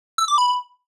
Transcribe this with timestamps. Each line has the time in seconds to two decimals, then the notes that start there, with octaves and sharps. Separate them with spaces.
0.18 E6
0.28 D6
0.38 B5